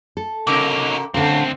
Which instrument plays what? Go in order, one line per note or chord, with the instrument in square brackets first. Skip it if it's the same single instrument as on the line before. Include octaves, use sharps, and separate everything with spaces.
[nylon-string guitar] A4
[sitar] G#2 C3 A#4 [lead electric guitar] D#4 F#4 [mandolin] D6
[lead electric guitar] D2 C4 [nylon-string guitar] D3 A#4 F5 [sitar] A3 C#4